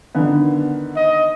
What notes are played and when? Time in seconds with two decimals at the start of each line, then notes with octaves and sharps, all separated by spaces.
0.15 D3 D#3 B3
0.96 D#5